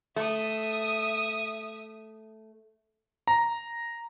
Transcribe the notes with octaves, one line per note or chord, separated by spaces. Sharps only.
A3 E5 D#6
A#5